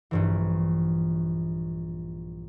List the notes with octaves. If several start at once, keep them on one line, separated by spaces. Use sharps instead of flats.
A#1 G2 E3